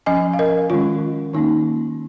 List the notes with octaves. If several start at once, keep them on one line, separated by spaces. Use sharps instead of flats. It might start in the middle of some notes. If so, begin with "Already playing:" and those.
F3 C#4 D#5 G#5
F5
A#4 D#5
D#3 G#3 C#4 F4
D#3 A#3 C#4 D#4